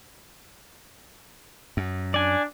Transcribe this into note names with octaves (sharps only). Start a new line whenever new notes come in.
F#2
D4 D5 G#5